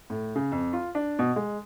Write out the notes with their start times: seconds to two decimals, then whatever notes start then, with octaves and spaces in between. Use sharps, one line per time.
0.10 A2
0.36 C#3
0.52 F2
0.73 F4
0.95 D4
1.19 B2
1.36 G#3